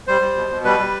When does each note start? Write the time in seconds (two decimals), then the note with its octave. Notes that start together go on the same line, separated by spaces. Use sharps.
0.07 G3 C5
0.22 G3
0.37 B2
0.51 B2
0.65 G3 B4
0.79 G3